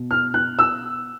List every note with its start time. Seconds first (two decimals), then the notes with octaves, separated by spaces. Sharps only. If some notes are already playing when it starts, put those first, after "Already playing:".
Already playing: B2
0.11 F6
0.34 F#6
0.59 E6